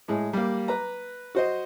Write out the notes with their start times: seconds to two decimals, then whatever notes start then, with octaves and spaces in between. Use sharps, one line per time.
0.08 A2 G#3
0.33 G3 A#3
0.68 B4 A#5
1.35 F#4 C5 D#5